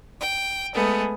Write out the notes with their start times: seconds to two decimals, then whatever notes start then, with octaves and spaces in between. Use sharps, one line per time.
0.19 G5
0.73 G#3 A3 B3 G#4